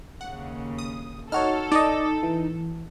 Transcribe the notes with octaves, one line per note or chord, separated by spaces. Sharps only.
D#2 C#3 F#5
D#6
D#4 F#4 A4 C#5 F6
D#4 D5 D#5
E3